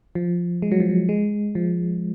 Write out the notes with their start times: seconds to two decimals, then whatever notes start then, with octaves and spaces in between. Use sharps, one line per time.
0.15 F3
0.62 G#3
0.72 F#3
0.80 F3
0.90 F#3
1.09 G#3
1.55 F3